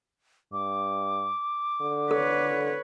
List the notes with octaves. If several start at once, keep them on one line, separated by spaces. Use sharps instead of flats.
G2 D6
D3
A4 B4 C#5